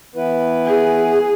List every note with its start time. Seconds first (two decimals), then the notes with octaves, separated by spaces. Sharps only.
0.15 E3 B3 E4 B4
0.66 G#4